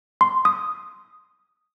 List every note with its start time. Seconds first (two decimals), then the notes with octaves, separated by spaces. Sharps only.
0.21 C6
0.45 D#6